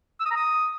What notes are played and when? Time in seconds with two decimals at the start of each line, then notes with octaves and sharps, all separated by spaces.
0.20 E6
0.26 D#6
0.31 A#5
0.36 D#6